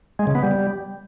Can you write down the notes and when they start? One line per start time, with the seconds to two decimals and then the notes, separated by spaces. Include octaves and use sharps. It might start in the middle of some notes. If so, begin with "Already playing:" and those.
0.19 G#3
0.27 C#3
0.35 B3
0.43 G3